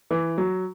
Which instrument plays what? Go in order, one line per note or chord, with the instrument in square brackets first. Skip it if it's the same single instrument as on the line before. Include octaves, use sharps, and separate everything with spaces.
[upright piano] E3
F#3